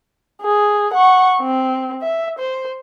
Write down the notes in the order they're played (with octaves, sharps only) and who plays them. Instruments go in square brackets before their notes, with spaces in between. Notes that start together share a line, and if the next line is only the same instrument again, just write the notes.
[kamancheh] G#4
F#5 C#6
C4
E5
C5